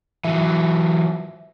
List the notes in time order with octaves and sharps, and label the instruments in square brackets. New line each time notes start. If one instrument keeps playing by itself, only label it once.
[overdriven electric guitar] E3 F#3 [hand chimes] E5